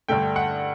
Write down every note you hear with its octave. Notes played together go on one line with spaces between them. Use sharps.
G2 D3 A3 G5
F#5